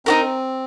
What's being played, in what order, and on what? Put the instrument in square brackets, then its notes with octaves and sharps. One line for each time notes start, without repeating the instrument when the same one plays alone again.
[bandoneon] C4 [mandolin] D#4 F#4 A#4